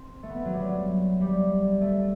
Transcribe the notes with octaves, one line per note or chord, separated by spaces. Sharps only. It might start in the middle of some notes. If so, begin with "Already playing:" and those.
Already playing: C4
A3
B3
F#3
G3
F#3
G3
A3